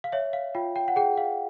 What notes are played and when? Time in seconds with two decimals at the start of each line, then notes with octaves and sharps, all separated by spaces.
0.04 F5
0.12 C#5 E5
0.33 F5
0.55 F4 G5
0.76 G5
0.88 F#5
0.96 G#4 G5
1.17 F5